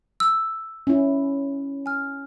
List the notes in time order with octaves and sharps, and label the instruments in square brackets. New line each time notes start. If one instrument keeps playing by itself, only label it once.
[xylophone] E6
[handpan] C#4 E4
[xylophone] G#5 F6